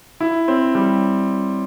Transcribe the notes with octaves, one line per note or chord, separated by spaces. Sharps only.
E4
C4
G3